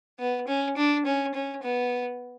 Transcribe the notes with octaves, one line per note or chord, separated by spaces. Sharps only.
B3
C#4
D4
C#4
C#4
B3